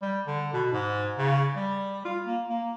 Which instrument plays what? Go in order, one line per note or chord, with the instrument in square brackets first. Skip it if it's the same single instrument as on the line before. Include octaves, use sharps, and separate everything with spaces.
[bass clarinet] G3
D3
B2
G#2
C#3
G3
F4
A#3
A#3